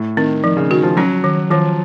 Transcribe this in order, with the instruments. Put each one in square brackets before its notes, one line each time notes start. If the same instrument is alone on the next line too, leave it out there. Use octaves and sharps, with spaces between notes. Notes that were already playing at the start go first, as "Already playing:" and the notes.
Already playing: [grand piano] A2
[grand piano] D#3 [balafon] C4
[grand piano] D#3 [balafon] F3
[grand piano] C#3
[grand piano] D#3 [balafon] F#4
[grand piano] F3
[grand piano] F#3 [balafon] C#4
[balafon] D#3
[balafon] D#3 [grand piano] F3